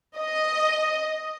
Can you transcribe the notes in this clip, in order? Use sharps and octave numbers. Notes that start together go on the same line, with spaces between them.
D#5